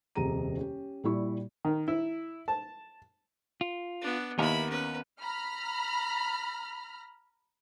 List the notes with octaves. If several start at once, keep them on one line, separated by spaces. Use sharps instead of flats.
D#1 F2 C3 G#4 A#5 D#7
C#4 G4
A#2 G3 E4 C#6
D#3
E4
A5
F4
B3 D4
D#2 B3 E4 A#4 B5
C#4 B4
A#5 B5 F6